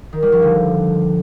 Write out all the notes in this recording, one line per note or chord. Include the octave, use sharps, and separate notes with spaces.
D#3
G3
F3
D3